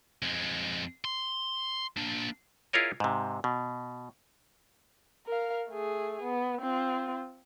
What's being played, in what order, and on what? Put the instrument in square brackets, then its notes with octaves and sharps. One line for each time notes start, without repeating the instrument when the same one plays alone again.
[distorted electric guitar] F2 G#3
C6
A#3 D4
[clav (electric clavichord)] E4 F4 G#4 A#4 C#5 D#5
G#2 C3
B2
[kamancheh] A#4 F5
A3 G#4
B3
C4 F4